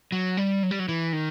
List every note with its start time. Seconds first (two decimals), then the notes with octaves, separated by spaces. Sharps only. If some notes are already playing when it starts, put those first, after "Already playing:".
0.12 F#3
0.37 G3
0.63 F#3
0.71 G3
0.79 F#3
0.89 E3
1.13 D#3